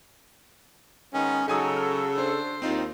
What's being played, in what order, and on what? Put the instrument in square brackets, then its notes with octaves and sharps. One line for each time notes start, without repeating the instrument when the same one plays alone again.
[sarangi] D#3 [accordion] G#3 B3 [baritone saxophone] C#4
[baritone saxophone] C#3 [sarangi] F#3 [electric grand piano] D#4 G#5 D#6 [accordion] A4
[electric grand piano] F6
[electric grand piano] D4 [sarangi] C5
[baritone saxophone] D#2 [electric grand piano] C4 D#4 F4